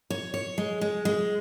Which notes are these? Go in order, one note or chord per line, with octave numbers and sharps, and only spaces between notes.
C#5
C#5
G#3
G#3
G#3